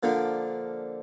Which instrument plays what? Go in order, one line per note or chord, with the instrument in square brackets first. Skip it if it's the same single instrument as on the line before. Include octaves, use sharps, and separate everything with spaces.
[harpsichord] D3 F3 A#3 D4